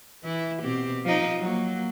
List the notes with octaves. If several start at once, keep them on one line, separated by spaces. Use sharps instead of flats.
E3 E4
B2 C4 G4
F3 D#4
F#3 A#3